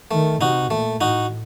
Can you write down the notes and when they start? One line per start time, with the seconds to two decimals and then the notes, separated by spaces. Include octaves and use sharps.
0.11 D#3 A3
0.40 C3 D#4 F#4
0.70 A#2 A3
1.00 A2 D#4 F#4